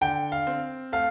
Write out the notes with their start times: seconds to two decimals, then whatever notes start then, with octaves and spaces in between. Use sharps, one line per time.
0.01 D3 G5
0.32 F5
0.47 C4
0.92 A3 F5